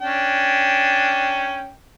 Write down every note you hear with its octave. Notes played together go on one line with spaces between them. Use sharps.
C#4 D4 G5